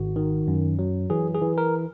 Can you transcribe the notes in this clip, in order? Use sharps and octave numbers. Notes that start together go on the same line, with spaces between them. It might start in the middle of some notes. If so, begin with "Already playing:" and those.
Already playing: G#1 F#4
D#3
F#2
F#3
E3 G#4
G#4
E3
A#4